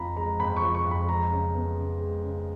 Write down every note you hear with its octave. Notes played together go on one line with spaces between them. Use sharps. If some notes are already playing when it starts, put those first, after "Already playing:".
Already playing: F2 F3 A#5 B5
G#3 A#5
F2 B5
C#6
F3
C#6
F2
B5
G#3 A#5
C#3
B3
C#3
G#3
C#3